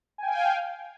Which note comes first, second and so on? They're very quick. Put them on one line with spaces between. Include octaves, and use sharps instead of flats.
G#5 G5 F5